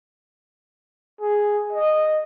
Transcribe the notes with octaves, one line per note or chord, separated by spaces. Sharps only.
G#4
D#5